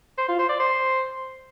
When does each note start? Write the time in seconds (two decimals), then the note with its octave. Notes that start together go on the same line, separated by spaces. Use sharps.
0.18 C5
0.28 F4
0.39 C5
0.49 D5
0.60 C5